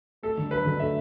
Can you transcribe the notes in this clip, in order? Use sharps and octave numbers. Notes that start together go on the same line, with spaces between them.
A3 A4
D3
F#3 B4
D3
A3 E5